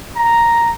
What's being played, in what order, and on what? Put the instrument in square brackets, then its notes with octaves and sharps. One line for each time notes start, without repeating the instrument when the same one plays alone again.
[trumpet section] A#5